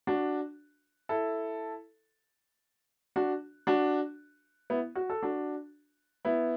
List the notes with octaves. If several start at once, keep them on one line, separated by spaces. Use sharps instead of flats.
D4 F#4
E4 A4
D4 F#4
D4 F#4
B3 E4
F#4
A4
D4 F#4
B3 E4